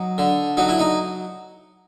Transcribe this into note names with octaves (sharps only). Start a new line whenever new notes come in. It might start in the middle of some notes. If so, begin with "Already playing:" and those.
Already playing: F#3 D#4
D3
F#3 D#4
E4
D#4